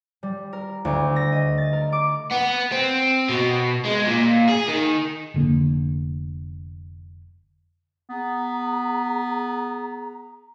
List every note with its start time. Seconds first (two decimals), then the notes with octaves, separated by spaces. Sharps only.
0.23 G3
0.53 A#4
0.85 D2
1.16 A#6
1.32 D#5
1.58 A6
1.73 A#4
1.92 D6
2.31 B3
2.72 C4
3.29 B2
3.85 G#3
4.07 A#2
4.49 G#4
4.69 D#3
5.34 F1 D3 A#3
8.10 B3 G#4 A#5